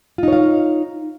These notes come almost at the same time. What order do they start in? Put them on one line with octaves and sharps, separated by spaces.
F4 D#4 C#5 F5